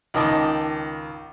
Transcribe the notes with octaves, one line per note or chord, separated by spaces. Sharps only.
C#2 D#3 D#5 A5 D6